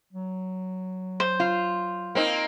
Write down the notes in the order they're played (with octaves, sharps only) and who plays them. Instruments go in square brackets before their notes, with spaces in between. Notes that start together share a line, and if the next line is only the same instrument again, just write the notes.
[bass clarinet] F#3
[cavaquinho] C5
[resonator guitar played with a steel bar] F4
[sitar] A#3 C4 D#4